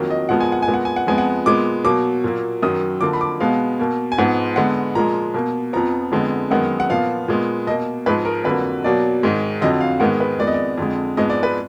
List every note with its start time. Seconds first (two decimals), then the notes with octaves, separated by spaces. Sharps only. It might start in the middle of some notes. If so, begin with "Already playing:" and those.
Already playing: F2 D#3 F#3 A#3
0.10 D#5
0.29 A#2 F3 G#3 B3 F#5
0.40 G#5
0.52 F#5
0.62 G#5
0.68 A#2 G#3 B3
0.74 F#5
0.85 G#5
0.96 F#5
1.07 F2 F3 G#3 B3 G#5
1.18 F#5
1.46 A#2 G#3 B3 D6
1.84 B2 F#3 A#3 D6
2.24 A#2 F#3 A#3
2.62 F#2 D#3 F#3 D#6
3.01 D3 F3 A#3 D6
3.13 B5
3.21 D6
3.40 B2 G#3 B3 F5
3.79 B2 A#3
4.12 G#5
4.18 G#2 F3 G#3 B3 F#5
4.56 D3 G#3 B3 F#5
4.95 A#2 F3 G#3 A#5
5.34 B2 A#3
5.73 F2 F3 B3 A#5
6.12 F2 D3 G#3 B3
6.51 F#2 D#3 G#3 B3 F#5
6.80 F#5
6.89 A#2 F3 B3 F5
7.28 A#2 G#3 B3
7.67 B2 A#3 D#5
8.06 G#2 F3 G#3 B4
8.25 A#4
8.44 F2 D3 F#3 A#3 B4
8.84 B2 F#3 A#3 D5
9.23 G#2 D#3 G#3
9.61 F2 D3 F#3 D#5
9.80 F5
10.00 G#2 D#3 G#3 B3 F#5
10.20 B4
10.39 F2 D#3 G#3 B3 D5
10.47 D#5
10.54 D5
10.78 F2 D3 G#3
11.17 G#2 F3 G#3 B3 D#5
11.30 D5
11.43 B4